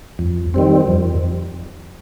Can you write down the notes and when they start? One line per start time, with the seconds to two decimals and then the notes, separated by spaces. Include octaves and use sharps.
0.19 F2
0.54 D#3 G3 C4
0.87 F2